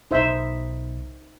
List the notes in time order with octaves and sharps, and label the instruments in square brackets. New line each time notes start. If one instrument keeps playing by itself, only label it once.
[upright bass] B1 B2 [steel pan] D#4 C5 E5